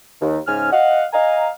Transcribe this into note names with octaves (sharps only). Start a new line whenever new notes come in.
D#2
G#2 C#3 G#5 F6
D#5 F5 F#5
D#5 F5 G#5 A#5